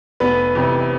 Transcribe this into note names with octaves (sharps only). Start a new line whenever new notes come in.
F1 B3 B4
F2 C3 E3